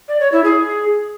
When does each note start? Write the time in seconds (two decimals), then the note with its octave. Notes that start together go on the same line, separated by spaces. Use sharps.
0.08 D5
0.20 C#5
0.32 E4
0.44 G#4